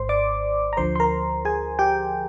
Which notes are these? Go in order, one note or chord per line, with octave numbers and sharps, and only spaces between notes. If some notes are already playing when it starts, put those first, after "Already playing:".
Already playing: G#1 G#2 C5 C6
D5 D6
A#5
D2 D3 F3 C5 C6
C6
A#4 A#5
G#4 G#5
G4 G5